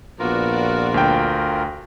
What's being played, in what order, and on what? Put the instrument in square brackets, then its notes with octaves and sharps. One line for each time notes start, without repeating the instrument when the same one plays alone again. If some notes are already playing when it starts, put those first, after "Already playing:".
[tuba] A#1 [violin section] B3 F#4 D5 [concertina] F4 A#4
[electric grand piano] D2 G5